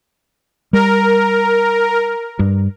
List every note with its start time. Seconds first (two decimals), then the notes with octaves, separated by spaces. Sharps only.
0.73 G3 A#4
2.39 G2